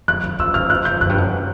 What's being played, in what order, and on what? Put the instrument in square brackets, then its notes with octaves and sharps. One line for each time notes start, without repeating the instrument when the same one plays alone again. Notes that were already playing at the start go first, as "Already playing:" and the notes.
[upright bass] F2 [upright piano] F#6
[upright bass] F2
[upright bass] E2 [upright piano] E6
[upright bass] F2 [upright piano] F6
[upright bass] E2 [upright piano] F#6
[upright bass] F2 [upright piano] G6
[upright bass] F#2 [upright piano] F#6
[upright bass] G2
F#2